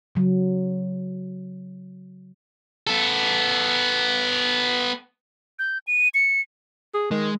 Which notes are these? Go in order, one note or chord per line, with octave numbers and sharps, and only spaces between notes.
C#3 F#3
B3 A4
G6
D#7
C#7
G#4
D#3 G#3